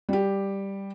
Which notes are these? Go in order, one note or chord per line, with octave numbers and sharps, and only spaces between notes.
G3 G4